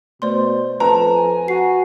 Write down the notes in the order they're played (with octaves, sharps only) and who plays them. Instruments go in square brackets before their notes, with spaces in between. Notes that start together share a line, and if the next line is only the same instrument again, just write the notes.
[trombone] B2 [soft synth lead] A3 [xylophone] C5 D5 C6
[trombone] F2 [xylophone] B4 [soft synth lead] A5 [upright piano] A#5
[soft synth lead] G#5
[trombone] F#4 [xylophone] C7